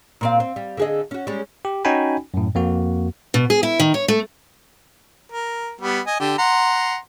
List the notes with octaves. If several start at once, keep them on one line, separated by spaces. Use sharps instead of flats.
A#2 C4 F5
C4
G3
D3 G#4 D#5
C#4 F#4
G3 G#3 C#4
G4
C#4 D#4 F#4 G5 G#5 B5
F#2 A2
F2 A#3 F#4
B2
G#4
E4
D#3
C#5
A3
A#4
G3 B3
D#5 G#5
D3 G4
F#5 A#5 C6